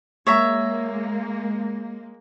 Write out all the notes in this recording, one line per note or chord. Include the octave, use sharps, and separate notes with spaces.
G#3 A#3 C#5 E5 A#5